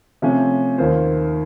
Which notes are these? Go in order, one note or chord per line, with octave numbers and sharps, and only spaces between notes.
C3 F3 A3 C#4
D#2 D#3 A#3 F4 C5